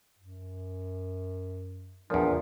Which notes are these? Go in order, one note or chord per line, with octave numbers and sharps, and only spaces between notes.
F#2
E2 A#2 F3 D4